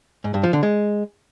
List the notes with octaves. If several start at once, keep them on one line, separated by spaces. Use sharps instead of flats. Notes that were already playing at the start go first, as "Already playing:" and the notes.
G#2
G2
F3
D3
G#3